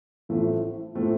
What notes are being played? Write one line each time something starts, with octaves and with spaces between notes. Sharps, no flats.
A1 A2 F3 A3 C4
A2 F3 A3 C4